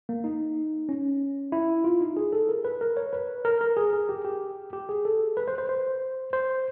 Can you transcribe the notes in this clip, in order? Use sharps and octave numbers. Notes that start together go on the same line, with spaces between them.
A#3
D#4
C#4
E4
F4
D#4
G#4
A4
A#4
B4
A#4
C#5
B4
A#4
A#4
G#4
G#4
G4
G4
G4
G#4
A4
B4
C5
C5
C5
C5